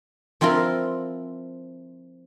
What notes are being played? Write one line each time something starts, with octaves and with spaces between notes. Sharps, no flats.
F3 C4 E4 F4 A#4